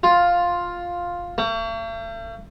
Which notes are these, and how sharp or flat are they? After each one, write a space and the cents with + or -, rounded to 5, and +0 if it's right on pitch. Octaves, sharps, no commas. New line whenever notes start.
F4 +5
A3 +45